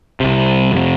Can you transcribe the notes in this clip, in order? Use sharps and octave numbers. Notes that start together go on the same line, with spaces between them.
C2 C3
F2 C3